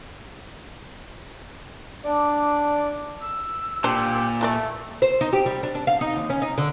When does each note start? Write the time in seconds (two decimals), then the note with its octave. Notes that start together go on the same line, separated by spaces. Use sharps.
2.04 D4 D5
3.21 E6
3.84 A#2 D4 G4 C5
4.41 E3 A3 A4 D5
5.02 C5
5.21 D#4
5.33 G4
5.46 G3
5.63 D4
5.75 D4
5.87 F5
6.01 D#4
6.16 D#2
6.30 C#4
6.42 D#4
6.58 D3